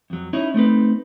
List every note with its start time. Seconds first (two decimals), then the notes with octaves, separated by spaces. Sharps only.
0.10 F2 F#3
0.33 C#4 D#4 E4 C#5 D#5
0.54 A3 C4 D#4 B4